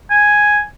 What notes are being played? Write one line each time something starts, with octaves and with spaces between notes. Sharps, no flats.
G#5